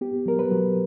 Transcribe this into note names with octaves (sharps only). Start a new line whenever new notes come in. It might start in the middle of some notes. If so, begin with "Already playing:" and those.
B3 G4
F#3 A#4
B4
F#3